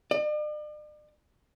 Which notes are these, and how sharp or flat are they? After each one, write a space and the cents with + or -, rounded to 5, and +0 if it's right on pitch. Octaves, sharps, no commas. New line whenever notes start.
D5 +45